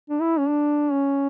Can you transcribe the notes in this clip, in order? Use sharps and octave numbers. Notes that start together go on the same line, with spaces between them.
D4
E4
C#4
D4
C#4